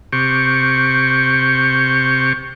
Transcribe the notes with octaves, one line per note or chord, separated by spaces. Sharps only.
C3 G4 C#6